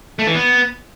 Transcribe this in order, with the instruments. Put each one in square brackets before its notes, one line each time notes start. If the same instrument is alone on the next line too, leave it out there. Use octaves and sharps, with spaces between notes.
[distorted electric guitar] A3
E3
B3